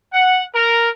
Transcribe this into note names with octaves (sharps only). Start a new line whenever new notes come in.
F#5
A#4